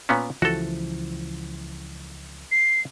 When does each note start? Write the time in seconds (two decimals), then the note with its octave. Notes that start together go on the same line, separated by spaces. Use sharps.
0.09 A#2 B3 C#4
0.42 C#2 E3 F3 F#4 A4
2.52 C7